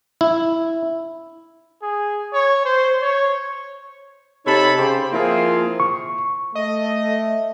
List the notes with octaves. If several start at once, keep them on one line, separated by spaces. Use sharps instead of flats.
E4
G#4
C#5
C5
C#5
C3 D#4 A4 C#5 A5 B5
C#3 G4 C5
F3 A#3 C4 E4 F4 G#4
C#6
A3 D#5